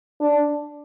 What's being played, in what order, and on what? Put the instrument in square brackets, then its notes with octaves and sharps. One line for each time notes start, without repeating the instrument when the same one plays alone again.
[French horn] D4